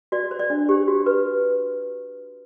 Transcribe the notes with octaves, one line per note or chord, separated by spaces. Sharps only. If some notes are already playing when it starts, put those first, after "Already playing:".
F#4 D5
C5
D5
D4
G4 C5
F#4
B4